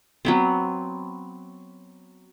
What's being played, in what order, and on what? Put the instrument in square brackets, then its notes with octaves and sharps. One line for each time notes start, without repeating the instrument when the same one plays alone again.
[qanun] F#3 B3 C4